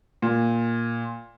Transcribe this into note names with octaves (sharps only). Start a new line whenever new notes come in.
A#2